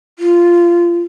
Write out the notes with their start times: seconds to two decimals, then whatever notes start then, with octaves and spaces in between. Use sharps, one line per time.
0.19 F4